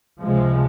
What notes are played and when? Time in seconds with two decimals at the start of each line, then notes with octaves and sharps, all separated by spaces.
0.20 C#2 C3 F3 G#3